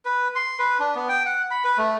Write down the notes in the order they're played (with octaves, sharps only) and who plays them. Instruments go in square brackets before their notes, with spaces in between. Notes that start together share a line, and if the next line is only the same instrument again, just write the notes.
[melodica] B4
C6
B4
D4
B3
G5
F#5
B5
B4
A3